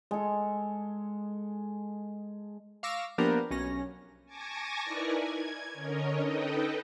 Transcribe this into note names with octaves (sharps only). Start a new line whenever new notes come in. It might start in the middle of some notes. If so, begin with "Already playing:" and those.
G#3 A4
F5 C#6 D6 E6 A#6
F3 A#3 B3 D4 G4 A#4
B1 C#4 A#6
G#5 A5 C#6 D6 G#6 A#6
D#4 E4 A#4 B4 D5 G#5
G#6
D3 C#4 A#4 C#5 D#5
D#4 A4 B4 D#5 G5